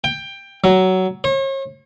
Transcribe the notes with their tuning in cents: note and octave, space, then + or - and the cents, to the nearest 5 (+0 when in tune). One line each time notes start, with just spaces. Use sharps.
G5 +15
F#3 +15
C#5 -40